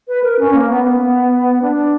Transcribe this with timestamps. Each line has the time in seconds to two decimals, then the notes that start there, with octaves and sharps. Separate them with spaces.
0.08 B4
0.23 A#4
0.39 C#4
0.54 A#3
0.70 B3
0.84 B3
1.62 D4